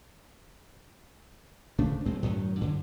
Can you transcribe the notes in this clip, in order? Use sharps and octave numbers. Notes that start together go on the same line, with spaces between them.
D1 C#3 A3 D4
F#2 G#3 C4
F#2 A2 D#3 F#3
F#2 D3